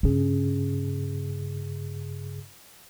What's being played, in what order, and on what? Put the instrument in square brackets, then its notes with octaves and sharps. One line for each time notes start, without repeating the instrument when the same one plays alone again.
[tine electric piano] G2 C#3 G#4 [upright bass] C#4